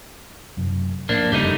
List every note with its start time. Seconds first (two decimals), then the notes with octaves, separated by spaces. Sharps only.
0.57 F#2 C3
1.09 A2 F3 A#3 D4
1.32 F#1 F2 C#3 G3 A3 D#4